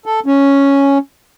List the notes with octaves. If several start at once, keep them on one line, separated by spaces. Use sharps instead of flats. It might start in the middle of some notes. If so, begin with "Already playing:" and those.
A4
C#4